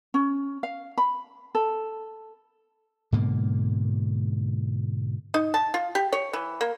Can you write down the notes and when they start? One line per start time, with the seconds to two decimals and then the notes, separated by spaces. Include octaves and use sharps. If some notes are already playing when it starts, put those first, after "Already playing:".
0.14 C#4
0.63 F5
0.98 B5
1.55 A4
3.12 G#2 B2 D3 A#3
5.34 D#4
5.54 A5
5.74 F4
5.95 G4
6.12 C#5
6.33 E3
6.61 A#3